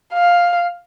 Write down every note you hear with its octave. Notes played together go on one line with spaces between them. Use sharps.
F5